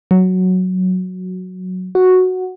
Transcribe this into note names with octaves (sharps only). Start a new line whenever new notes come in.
F#3
F#4